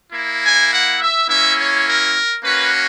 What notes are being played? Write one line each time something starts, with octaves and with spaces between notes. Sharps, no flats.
A#3 E4
G#5
F#5
E5
A#3 C#4 E4 E5
C#5
A#4
A#3 C#4 F#4 B4